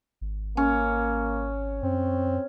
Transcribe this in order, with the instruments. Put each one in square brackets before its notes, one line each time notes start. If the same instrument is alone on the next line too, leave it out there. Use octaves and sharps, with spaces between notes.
[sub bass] G#1
[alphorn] A#3 [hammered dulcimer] C#4
[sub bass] F#2 [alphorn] C4